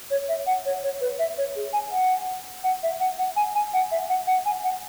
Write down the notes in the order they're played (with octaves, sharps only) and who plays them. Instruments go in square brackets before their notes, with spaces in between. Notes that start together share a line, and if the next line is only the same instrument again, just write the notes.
[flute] C#5
E5
F#5
C#5
C#5
B4
E5
C#5
G#4
G#5
F#5
F#5
E5
F#5
F#5
G#5
G#5
F#5
E5
F#5
F#5
G#5
F#5